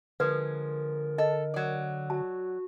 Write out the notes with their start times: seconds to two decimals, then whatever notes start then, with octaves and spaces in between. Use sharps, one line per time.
0.20 D3 F3 G#3 A#4 B4
1.18 A4 D#5
1.54 F#3 D5
2.10 F#4 A5